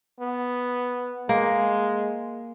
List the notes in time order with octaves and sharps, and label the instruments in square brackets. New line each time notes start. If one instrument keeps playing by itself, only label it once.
[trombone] B3
[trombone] G#3 [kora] A#3